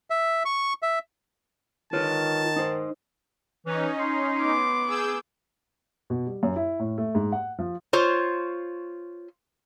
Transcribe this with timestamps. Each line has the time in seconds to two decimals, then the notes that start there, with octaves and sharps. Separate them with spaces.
0.10 E5
0.45 C#6
0.83 E5
1.93 D#3 F4 B4 C#5 A5
2.56 D#4 C5
3.66 E3 C#4 D#4
3.99 C6
4.41 B3 D6
4.87 G#4 E6 G6
6.10 B2
6.27 G3
6.43 F#2
6.56 E4
6.79 A2
6.98 A3
7.15 G#2
7.32 F#5
7.59 F3
7.93 F4 C5 C#5